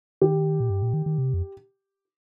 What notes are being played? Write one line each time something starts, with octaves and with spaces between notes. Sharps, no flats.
D#3 G4
A#2
G2
A#2
D#3
D#3
C3
F2